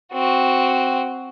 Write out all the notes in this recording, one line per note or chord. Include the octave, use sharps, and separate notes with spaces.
C4 F#4